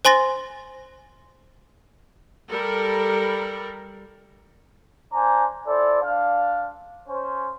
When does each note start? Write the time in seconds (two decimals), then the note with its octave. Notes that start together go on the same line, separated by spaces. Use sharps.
0.05 C5 G#5 C6 A6 A#6
2.51 G3 A4 A#4
5.13 D4 C5 G#5 A#5 D6
5.67 E4 A4 C5 D5
6.02 D4 F5
7.09 C#4 C5